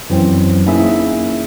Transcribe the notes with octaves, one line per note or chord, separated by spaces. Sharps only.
F#2 E3 F#3 C4
A#3 C#4 D#4 E4 G#4 E5